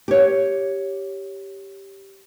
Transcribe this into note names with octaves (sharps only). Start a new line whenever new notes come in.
G4 C#5